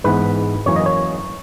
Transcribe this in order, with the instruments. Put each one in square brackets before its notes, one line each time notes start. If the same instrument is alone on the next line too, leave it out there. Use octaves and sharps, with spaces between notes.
[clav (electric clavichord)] G#2 E3 B3 B4
F#2 E3 A#3 C#4 C#5
D#5
C#5